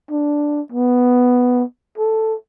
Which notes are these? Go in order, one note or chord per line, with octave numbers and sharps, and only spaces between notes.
D4
B3
A4